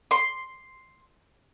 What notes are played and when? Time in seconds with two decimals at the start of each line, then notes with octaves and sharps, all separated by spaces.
0.11 C6